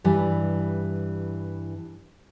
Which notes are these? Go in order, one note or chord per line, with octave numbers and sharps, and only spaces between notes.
G2 E3 G3